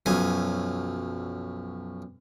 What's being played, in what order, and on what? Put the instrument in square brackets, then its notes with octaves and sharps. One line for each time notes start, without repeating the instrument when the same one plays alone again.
[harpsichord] B1 F#2 F3 G#5